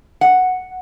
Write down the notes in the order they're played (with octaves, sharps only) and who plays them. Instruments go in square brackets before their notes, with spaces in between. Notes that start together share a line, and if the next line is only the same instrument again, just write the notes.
[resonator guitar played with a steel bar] F#5